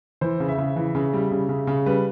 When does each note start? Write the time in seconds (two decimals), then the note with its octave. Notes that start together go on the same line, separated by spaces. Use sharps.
0.21 E3 C5
0.40 C#3
0.48 E5
0.58 C#3
0.76 E3
0.95 C#3
1.13 G3
1.31 C#3
1.49 C#3
1.67 C#3
1.86 G3 B4